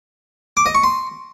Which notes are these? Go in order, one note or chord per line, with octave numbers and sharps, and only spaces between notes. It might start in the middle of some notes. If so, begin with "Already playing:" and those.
D6
D#5
C#6
C6